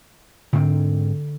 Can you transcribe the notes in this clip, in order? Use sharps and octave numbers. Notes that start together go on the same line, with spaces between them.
G#2 D3 C4